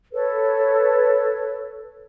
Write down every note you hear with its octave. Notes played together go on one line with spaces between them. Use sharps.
A4 B4 C#5